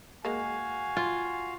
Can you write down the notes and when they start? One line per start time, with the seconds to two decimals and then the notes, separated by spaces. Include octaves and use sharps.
0.25 G#3 A#3 F#4 F5 G#5
0.97 F4